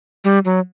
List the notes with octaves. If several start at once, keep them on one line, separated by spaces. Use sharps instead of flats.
G3
F#3